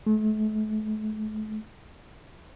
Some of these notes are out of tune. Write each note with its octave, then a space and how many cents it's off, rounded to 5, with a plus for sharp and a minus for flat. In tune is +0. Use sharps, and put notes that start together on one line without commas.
A3 -35